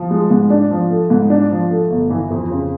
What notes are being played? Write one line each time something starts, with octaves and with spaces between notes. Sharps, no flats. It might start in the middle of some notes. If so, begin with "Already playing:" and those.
Already playing: F3
G#3
G#2
D4
F3
A3
G#2
D4
F3
A3
G1
E3
F2
C#3